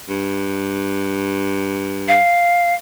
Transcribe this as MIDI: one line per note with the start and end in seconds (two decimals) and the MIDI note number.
0.09 2.17 43
2.08 2.75 77